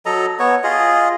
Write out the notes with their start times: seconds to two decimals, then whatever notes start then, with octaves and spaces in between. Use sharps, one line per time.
0.06 F#3 A4 D#5 A#5
0.39 B3 C#5
0.64 F4 G#4 D#5